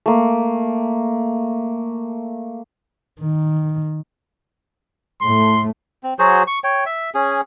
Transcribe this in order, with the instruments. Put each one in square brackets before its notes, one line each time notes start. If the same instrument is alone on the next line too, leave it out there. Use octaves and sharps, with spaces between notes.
[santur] A3 A#3
[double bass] D#3
[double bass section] A2 A3 [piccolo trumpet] C6
[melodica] C4
F#3 F#4 G#4 C5
C#6
C#5 G5
E5
C#4 G#4